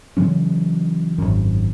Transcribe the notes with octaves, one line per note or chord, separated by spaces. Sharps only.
C#3 E3 F#3 C#4
G#1 F#2